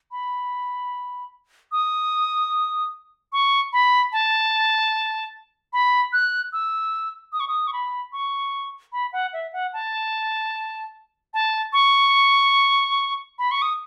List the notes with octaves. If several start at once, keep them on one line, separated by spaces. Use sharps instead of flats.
B5
D#6
C#6
B5
A5
B5
F#6
E6
D#6
C#6
D#6
C#6
B5
C#6
B5
F#5
E5
F#5
A5
A5
C#6
B5
C#6
D#6